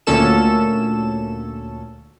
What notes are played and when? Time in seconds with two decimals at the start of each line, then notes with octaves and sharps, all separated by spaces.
0.07 D2 A#2 C#4 A4 E7